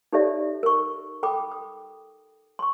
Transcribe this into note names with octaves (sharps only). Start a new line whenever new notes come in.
D#4 G4 A4 C#5 D5 E5
A#4 C#6
A4 G5 B5 D6 D#6
D#6
C6 C#6